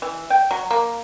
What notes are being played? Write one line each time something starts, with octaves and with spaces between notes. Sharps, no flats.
E3
G5
F#3
A#3